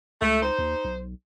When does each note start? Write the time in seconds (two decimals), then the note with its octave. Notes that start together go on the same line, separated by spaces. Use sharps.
0.22 C#2 A3
0.43 D#4 C5
0.58 D#2
0.85 B1